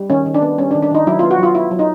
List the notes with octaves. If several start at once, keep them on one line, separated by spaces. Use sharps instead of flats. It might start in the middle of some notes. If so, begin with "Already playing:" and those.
Already playing: G3
D#3 C#4
D#3
D4
B3
G3 C#4
D4
D#3
D4
D#3 D#4
F#3 E4
B3 F4
F#4
F#3 F4
B3 E4
F#3
D#4